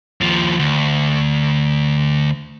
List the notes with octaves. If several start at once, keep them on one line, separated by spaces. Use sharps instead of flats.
D#2 F3
D2